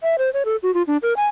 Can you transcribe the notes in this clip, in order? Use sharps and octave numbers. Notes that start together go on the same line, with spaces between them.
E5
C5
C#5
A4
F#4
F4
D4
A#4
G#5